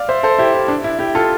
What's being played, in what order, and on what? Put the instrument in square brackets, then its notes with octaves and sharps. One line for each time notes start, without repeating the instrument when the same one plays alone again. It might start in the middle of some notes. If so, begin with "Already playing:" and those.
Already playing: [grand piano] D5 F5
C5 E5
A4 C5
E4 G4
E4
D4
E4
E4 G4
F4 A4